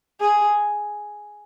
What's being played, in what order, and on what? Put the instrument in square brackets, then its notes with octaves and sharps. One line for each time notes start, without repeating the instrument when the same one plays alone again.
[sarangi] G#4